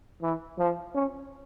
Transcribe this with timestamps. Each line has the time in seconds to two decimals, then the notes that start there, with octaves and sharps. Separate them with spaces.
0.22 E3
0.58 F3
0.94 C#4